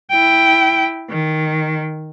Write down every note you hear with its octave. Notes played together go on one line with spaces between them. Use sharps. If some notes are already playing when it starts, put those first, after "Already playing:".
E4 G5
D#3